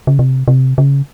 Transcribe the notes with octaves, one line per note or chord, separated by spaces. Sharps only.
C#3
C3
C3
C#3